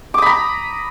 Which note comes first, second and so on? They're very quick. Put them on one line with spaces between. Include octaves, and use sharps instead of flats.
D6 D#6 B5 A#5